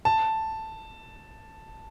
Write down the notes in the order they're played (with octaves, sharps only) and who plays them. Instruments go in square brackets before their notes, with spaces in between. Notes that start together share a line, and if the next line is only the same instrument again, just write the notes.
[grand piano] A5